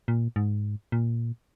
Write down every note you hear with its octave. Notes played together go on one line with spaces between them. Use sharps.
A#2
G#2
A#2